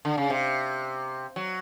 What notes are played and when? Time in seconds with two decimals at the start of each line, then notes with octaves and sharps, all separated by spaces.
0.05 D3
0.18 C#3
0.30 C3
1.36 F#3